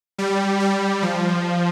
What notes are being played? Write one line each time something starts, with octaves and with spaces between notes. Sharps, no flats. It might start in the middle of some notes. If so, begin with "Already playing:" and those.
G3
G3
F3